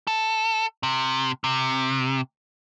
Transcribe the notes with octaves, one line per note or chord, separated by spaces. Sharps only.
A4
C3
C3